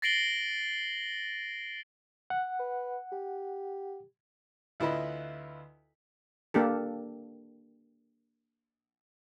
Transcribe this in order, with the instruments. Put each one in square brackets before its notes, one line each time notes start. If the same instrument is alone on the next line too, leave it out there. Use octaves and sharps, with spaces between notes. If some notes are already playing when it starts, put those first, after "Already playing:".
[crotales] A6 A#6 C7 D7 F#7 G7
[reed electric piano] F#5
[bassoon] B4
G4
[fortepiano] D2 E4 F4 B4 D#5 B5
[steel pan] A#3 D4 G4 A4